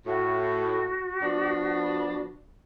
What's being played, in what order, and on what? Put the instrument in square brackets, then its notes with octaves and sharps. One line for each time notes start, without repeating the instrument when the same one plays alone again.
[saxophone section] A2 [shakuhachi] F#4
[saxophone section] F3 B3 D4